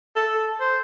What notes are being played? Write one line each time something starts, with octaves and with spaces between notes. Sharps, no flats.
A4
C5